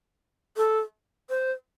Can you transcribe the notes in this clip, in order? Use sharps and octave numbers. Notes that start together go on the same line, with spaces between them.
A4
C5